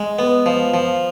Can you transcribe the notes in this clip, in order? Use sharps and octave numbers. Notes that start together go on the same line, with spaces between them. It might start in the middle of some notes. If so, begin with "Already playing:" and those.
Already playing: G#3
B3
F3
F3